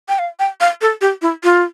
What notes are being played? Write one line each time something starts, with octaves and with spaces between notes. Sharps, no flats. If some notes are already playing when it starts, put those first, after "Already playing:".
G5
F5
G5
F5
A4
G4
E4
F4